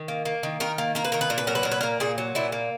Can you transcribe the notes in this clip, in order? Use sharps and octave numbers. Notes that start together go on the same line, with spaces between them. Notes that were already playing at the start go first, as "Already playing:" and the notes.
Already playing: D#3
A#3
A#3
D#3
D#3 A#4
A#3
A#3 A#4
B4
D#3 A#4
B4
A#2 A#4
B4
F#3 A#4
B4
A#2 A#4
B4
A#4
A#3
A#2 G#4
F#3
A#2 E4
A#3